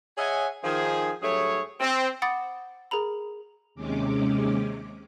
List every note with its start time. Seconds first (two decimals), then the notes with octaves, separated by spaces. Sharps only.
0.17 G#4 C#5 D#5 E5 F#5 G#5
0.63 D#3 F3 G#4
1.22 G2 F#3 A3 G#4 C#5
1.80 C4
2.22 F#5 B5 D6 D#6 A6 D7
2.91 G#4 A#4 A#5 B5
3.75 D#2 C3 G#3 C#4 D6